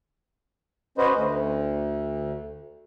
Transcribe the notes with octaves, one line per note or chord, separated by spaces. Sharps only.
C#4 F#4 B4 C5 D#5
D2